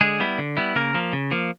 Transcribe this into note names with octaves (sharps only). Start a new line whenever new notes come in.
D3 G#3 G#4
G3 B3 E4
D3
G3 B3 E4
C#3 A#3 A#4
F3 A#3
C#3
F3 A#3